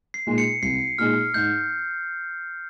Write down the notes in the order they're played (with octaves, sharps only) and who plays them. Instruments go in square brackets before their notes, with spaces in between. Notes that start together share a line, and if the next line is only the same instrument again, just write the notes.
[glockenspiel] C7
[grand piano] A#2 G#3 D#4 G#4
[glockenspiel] C#7
[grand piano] C2 [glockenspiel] C7
[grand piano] A#2 G#3 D#4 G#4 [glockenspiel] F6
[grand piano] G#2 [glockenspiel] G6